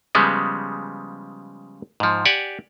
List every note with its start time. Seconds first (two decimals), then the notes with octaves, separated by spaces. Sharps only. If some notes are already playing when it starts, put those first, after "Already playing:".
0.15 C#3 F3 G3 G#3 B3
2.00 G#2 F3
2.25 G4 D5 F#5 G#5